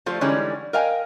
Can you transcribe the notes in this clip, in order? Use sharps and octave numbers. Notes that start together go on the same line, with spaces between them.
F3 G3 A3 F4 A4 C5
D3 E3 G3 G#3 C#4 D#4
A#4 D#5 F5 G5 G#5